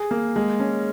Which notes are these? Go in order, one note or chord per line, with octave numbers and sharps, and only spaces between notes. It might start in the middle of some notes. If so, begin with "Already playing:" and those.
Already playing: G#4
A#3
G#3
C#4